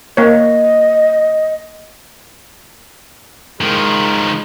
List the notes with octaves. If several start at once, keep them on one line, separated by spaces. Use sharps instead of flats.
A#3 C#5 D#5
D#3 F3 G#3